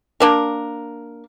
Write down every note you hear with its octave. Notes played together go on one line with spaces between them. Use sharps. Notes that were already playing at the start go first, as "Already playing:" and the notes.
A#3 D4 A#4